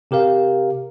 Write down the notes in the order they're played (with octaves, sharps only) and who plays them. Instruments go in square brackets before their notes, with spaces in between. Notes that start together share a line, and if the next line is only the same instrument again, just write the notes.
[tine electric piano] C3 G4 A#4 F5